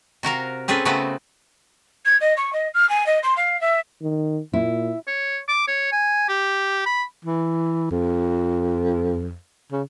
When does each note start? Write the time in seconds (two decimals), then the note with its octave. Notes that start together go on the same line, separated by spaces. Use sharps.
0.23 C3 F#4 A#4 F5
0.68 C4 C#4 G#4 A4 B4
0.85 C#3 A3 B3 C4 F#4 B4
2.05 G#6
2.20 D#5
2.37 C#6
2.53 D#5
2.74 F6
2.89 G#5
3.06 D#5
3.23 C6
3.36 F5
3.61 E5
4.02 D#3
4.53 A#2 E4
5.07 C#5
5.49 D6
5.68 C#5
5.92 G#5
6.29 G4
6.86 B5
7.25 E3
7.91 F2
9.72 C#3